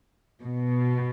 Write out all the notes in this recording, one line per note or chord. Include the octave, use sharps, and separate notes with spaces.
B2